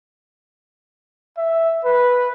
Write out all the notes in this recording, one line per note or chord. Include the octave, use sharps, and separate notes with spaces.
E5
B4